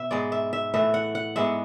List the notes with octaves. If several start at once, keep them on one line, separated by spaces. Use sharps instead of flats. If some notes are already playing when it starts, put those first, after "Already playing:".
Already playing: B2 E5
G#2 G#3 B3 D5
E5
E5
A2 E3 A3 E5
F#5
F#5
G#2 G#3 B3 E5